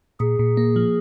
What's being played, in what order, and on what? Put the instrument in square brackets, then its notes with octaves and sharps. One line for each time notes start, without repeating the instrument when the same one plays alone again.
[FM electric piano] A#2 [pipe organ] G#4
[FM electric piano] A#2
A#3
F3